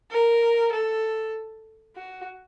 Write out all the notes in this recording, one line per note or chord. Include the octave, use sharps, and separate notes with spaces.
A#4
A4
F#4